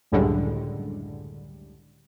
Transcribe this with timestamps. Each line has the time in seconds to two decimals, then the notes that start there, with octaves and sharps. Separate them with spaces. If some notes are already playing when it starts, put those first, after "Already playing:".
0.12 C#2 F#2 A2 D3 G3 G#3